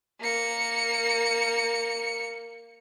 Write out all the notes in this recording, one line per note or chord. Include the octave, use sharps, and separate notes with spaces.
A#3 C#7